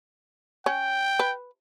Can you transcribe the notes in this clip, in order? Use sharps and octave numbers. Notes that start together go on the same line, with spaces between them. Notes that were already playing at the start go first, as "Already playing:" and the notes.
C#4 G5
B4